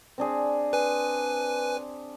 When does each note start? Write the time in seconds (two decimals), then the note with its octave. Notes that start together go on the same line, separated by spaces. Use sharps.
0.18 C4 D4 G#4
0.73 B4 G#5